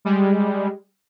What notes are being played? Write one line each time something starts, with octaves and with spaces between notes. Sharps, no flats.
G3 G#3